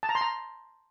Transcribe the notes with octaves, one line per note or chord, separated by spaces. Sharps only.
A5
A#5
C6
A#5